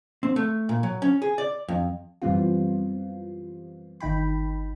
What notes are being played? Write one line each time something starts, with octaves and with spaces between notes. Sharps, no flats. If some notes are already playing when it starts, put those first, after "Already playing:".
C4
A3
A#2
F#3
C#4
G#4
D5
F2
F#2 E3 G3 B3 C4 F4
G1 D#3 D#4 G5 B5